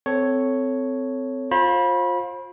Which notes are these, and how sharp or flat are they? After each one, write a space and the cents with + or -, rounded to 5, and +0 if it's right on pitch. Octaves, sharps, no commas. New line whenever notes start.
C4 -20 A4 +0 C#5 +0
F4 +25 C5 +30 B5 -25